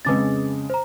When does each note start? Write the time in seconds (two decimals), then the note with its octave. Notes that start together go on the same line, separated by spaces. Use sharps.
0.05 F2 C#3 G#3 B4 D6 A6
0.70 C5 A#5